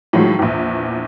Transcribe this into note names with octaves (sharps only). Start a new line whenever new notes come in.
A2 D#3 F3 F#3 G#3
A#1 E2